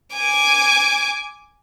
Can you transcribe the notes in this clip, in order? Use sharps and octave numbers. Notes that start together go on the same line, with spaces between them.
G#5 D6